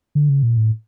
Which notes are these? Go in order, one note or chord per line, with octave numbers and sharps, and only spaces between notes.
D3
C#3
A#2
A2